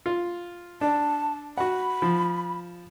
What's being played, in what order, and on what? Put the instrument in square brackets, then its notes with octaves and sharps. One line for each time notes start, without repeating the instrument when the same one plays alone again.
[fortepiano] F4
[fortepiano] D4 [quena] A5
[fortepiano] F#4 F#5 [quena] B5
[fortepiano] F3